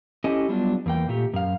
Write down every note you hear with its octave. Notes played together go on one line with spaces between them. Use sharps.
C#4 E4 G4 A4 D#5 G#5
F#3 G3 B3 D4 F4
E2 A#3 G5
A#2 A3 G4
F#2 F5